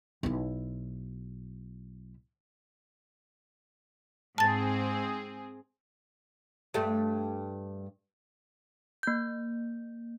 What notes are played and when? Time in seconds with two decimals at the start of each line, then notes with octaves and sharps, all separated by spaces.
0.23 B1 E4
4.38 G#2 C4 G#4 A5 A6
6.74 G2 A3
9.03 A#3 G6